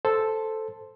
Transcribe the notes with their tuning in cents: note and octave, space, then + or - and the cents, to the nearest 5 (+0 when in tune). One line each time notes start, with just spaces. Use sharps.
A4 +0 C5 +0